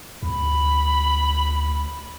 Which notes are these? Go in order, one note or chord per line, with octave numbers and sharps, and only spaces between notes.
D2 B5